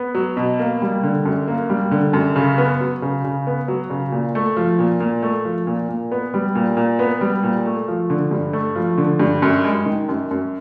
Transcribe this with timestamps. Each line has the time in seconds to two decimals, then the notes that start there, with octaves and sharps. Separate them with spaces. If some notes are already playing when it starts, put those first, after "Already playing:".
Already playing: B3
0.15 F#3
0.37 B2
0.60 A#3
0.82 G3
1.03 D3
1.25 F#2
1.48 A#3
1.69 G3
1.91 D3
2.13 F#2
2.36 C#3
2.58 B3
2.80 F#3
3.02 C#3
3.24 C#3
3.47 B3
3.68 F#3
3.90 C#3
4.12 A#2
4.35 A3
4.56 F3
4.79 A#2
5.00 A#2
5.23 A3
5.45 F3
5.67 A#2
5.89 A#2
6.12 B3
6.34 G3
6.55 A#2
6.77 A#2
6.99 B3
7.21 G3
7.43 A#2
7.66 A3
7.88 F3
8.10 D3
8.31 G2
8.53 A3
8.75 F3
8.98 D3
9.20 G2
9.42 F#2
9.65 G#3
9.86 D#3
10.09 F#2
10.31 F#2